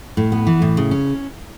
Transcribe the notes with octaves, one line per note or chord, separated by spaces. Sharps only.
A2
B3
E3
A2
C#3
C#4